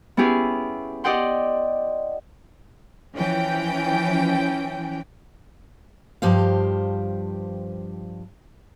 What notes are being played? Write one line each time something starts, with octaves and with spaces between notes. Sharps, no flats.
B3 C#4 E4 G4 G#4 B4
G4 D5 D#5 F#5 G5 C6
E3 F3 C#4 G5
G2 F3 G4 C5 F5